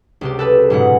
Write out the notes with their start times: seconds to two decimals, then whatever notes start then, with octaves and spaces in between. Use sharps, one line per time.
0.21 C#2 C3 G4
0.39 A4 B4 A5
0.70 F#1 G#2 B2 G#3 F#5